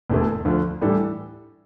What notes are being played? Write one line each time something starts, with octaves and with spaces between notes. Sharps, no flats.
E1 E2 D3 A3
D2 D3 F3
A2 E3 G3 D4 A4